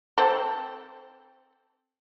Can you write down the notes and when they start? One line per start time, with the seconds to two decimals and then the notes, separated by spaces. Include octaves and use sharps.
0.18 C4 A4